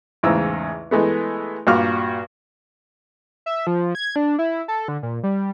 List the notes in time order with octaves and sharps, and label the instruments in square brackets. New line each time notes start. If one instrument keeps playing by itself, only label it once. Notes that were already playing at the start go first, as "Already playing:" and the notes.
[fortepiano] A1 E2 G#2 C#3 D#4 E6
E3 G#3 A3 B3
G2 A#2 F4 F#4 D6 F6
[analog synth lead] E5
F3
G#6
D4
E4
A4
D3
A#2
G3